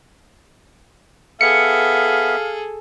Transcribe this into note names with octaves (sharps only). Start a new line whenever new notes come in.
B3 G#4 A4 E5 F5 C#7